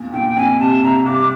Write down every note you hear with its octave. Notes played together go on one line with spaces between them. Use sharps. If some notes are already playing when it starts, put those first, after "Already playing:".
Already playing: E2 A#2
A#2 G5
F2 G#5
C3 A5
C2 A#5
C2 D6